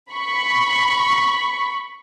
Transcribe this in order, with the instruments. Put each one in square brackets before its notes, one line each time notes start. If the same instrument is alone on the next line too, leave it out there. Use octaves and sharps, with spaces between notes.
[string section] B5 C#6